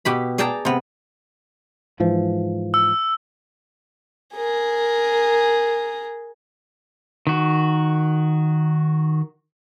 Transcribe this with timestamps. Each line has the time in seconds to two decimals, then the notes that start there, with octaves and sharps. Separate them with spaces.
0.05 B2 G4 B5
0.38 G#4 D5 G5 A5 A#5
0.65 C3 B3
2.00 G#2 E3 F3
2.74 E6
4.35 G#4 A#4
7.27 D#3 F#4